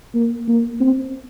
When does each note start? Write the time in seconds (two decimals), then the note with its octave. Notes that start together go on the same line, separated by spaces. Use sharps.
0.15 A#3
0.48 A#3
0.80 C4